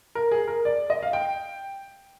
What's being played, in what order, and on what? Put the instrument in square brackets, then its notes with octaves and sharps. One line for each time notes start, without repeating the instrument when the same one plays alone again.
[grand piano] A#4
G#4
A#4
D5
D#5
F5
G5